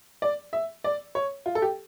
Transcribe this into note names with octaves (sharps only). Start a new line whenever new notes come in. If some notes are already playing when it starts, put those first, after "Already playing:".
D5
E5
D5
C#5
F4
A4
G4